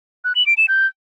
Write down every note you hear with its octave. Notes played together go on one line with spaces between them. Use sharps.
F#6
F#7
D7
E7
G6